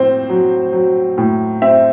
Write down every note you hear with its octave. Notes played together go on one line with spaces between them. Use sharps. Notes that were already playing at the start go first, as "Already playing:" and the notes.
Already playing: A2 C4 C5
F#3
F#3
A2
C4 E5